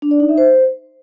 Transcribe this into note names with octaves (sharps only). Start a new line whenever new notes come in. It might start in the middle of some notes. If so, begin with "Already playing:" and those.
D4
D5
D#4
E5
C5